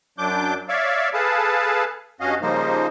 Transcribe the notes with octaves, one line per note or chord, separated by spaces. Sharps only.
F#2 F#3 D4 D6 G6
C#5 D5 E5 F5
G#4 A4 B4 F5 A5
G2 C#4 F#4 D#5 F5
C#3 F3 G3 A#3 D#4 C5